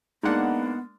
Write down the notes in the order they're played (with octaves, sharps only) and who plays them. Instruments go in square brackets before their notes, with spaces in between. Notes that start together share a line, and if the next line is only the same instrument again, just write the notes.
[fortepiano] G#3 A#3 D4 [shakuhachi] B3 [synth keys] D#4 F#5